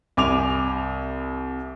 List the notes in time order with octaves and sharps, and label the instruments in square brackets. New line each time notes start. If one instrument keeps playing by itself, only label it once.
[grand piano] C2 G#5 D6 F7